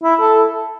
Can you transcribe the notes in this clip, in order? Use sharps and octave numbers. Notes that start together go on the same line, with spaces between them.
E4
A4